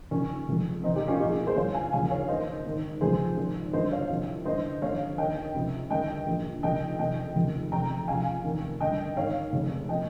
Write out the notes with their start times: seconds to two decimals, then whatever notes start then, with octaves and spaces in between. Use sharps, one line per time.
0.11 D#2 C#3 F3 C#4
0.47 F1 F2 C#3 F3
0.84 F1 D#2 D#3 C4 D#4
0.96 D#4 G4
1.08 C#4 F4
1.20 C2 A#2 F3 D#4 G4
1.29 F4 G#4
1.47 G#4 C5
1.55 G1 G2 F3 C#5 F5
1.74 F5 G#5
1.92 D#2 C#3 F3 F5 G#5
2.11 C#5 F5
2.28 D#2 D#3 C5 D#5
2.64 G#1 G#2 D#3
3.01 F1 F2 C#3 F3 G#4 C5
3.37 G#1 G#2 F3
3.73 G1 G2 F3 C5 D#5
3.91 C#5 F5
4.09 C2 C3 F3
4.45 G1 G2 D#3 C5 D#5
4.82 G1 F2 D#3 C#5 F5
5.18 D#2 D#3 D#5 G5
5.54 C#2 C3 F3
5.90 G1 G2 D#3 D#5 G5
6.27 A#1 A#2 F3
6.63 F1 D#2 C#3 F3 D#5 G5
6.99 F1 F2 C3 D#3 D#5 G5
7.35 F1 D#2 C#3 F3
7.72 F1 F2 C3 G5 A#5
8.08 C#2 C3 F3 F5 G#5
8.44 F1 D#2 D#3
8.80 G1 G2 D#3 D#5 G5
9.16 G#1 G#2 D#3 C#5 F5
9.53 F1 F2 C#3
9.89 A#2 F3 D#5 G5